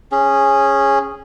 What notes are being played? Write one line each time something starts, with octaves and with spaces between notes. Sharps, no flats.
C#4 G#4